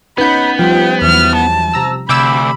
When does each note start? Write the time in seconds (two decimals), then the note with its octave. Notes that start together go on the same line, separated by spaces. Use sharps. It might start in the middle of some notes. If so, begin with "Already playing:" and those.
0.18 B3 C#4 D#4 B4 F#5 B5 G6
0.59 F3 G3 F4 G5
1.02 E2 E3 F#3 F6
1.36 A5
1.73 C3 A#5 E6
2.09 D2 C3 B5 D6 E6